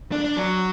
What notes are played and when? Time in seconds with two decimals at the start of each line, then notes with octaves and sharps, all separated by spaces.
0.12 D4
0.25 D4
0.36 F#3